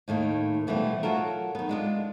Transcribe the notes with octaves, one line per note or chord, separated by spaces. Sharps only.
D#2 A2 D#3 A#3
B2 E3 F3 G3 A3
F#3 F4 F#4 A4 A#4
D#3 B3
G#3 D4 F4